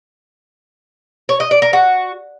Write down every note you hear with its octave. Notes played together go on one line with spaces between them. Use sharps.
C#5
D#5
D5
A#4
F#4